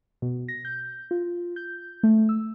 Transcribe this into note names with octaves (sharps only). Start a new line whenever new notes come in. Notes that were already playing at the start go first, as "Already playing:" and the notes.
B2
A#6
G6
F4
G6
A3
E6